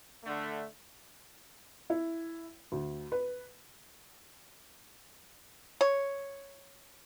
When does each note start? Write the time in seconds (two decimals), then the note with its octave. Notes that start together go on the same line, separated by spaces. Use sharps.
0.24 D3 A3
1.90 E4
2.72 D2
3.12 B4
5.81 C#5